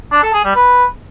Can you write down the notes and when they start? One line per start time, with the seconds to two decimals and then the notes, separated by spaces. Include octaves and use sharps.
0.12 D4
0.23 A4
0.34 G#4
0.44 G3
0.55 B4